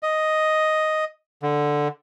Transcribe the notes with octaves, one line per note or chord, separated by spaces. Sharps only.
D#5
D3